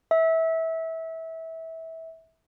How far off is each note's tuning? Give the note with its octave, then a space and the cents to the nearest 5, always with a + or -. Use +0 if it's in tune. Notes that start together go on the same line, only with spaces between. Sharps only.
E5 -20